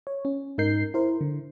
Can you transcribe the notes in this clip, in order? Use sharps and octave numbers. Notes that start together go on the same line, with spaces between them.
C#5
C#4
G#2 D#4 A#4 G6 C7
E4 A#4 C5
D3